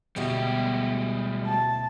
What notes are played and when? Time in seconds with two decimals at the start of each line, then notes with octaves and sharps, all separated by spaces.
0.16 D2 B2 G3 G#3 E4 G4
1.46 A5